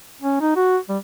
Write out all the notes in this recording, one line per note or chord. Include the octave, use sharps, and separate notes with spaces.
C#4
D#4
F#4
G3